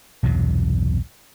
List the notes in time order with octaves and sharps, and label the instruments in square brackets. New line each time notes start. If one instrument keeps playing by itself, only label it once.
[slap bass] B1 E2 G2 C3